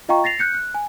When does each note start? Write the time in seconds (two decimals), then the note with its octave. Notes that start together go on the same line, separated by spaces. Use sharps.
0.09 F4 D#5 F5 G5 A#5 C#6
0.24 A6 A#6 C7 F7
0.39 F#6 G6 C#7
0.54 F#6
0.74 G#5